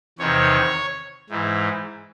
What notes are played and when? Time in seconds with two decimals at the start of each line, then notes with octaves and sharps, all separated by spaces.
0.18 E2 C3 D#3 C#5
1.30 G#2 E3